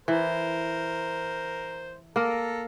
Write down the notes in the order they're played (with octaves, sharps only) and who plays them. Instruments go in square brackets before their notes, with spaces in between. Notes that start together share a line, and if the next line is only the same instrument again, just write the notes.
[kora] E3 [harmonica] A#4 C5
[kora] A#3 A#4 [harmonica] A4 A#5